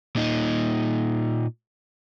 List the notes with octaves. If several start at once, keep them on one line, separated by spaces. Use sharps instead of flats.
A#2 D#4